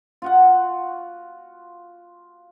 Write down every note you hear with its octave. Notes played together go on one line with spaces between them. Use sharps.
F4 F#4 F#5